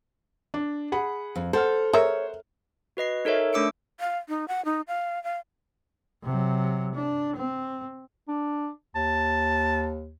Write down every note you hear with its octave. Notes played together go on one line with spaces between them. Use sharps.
D4
G#4 F#5 B5
F2
A4 C5 F#5 F6
G#4 A#4 C#5 E5
F#4 B4 D#5 C7
D#4 A4 A#4 C#5 E5
A3 D4 D6 E6 C#7 D7
F5
D#4
F#5
D#4
F5
F5
C3 F#3
D4
C4
D4
D#2 A5